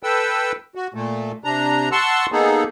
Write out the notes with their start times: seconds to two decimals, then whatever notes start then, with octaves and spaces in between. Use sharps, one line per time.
0.03 A4 B4 G5 E6
0.75 F#4
0.94 A#2 A3
1.44 C3 D4 A#5
1.92 F#5 A5 C6 C#6 E6
2.32 A#3 B3 D#4 G#4 A4